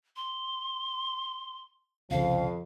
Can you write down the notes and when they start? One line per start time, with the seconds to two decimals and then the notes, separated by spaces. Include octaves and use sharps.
0.16 C6
2.11 C2 F2 C#3 F3 F5